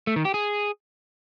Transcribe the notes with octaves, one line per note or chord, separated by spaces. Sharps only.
A3
D#3
G4
G#4